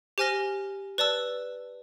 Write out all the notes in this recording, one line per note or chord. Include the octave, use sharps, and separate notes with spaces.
G4 C5 G#5 F6 A#6 G7
B4 D5 A5 E6